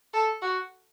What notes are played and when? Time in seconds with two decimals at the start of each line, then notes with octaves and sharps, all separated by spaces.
0.14 A4
0.42 F#4